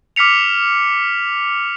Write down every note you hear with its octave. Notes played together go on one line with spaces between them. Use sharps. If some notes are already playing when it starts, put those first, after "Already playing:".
D6 F6 B6 C#7 F7